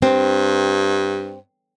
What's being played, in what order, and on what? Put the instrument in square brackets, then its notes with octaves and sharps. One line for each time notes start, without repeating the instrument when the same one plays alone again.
[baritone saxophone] G2 [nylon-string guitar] C4